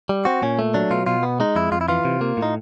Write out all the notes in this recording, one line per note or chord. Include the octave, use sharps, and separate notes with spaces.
G3
C4 F#4
A#2 C#4
A3
F#3 D4
B2 F4
B2 F4
B3
G#3 D#4
F2 E4
F2 F4
E4
E3 F4
C3
A#3
A2
D#4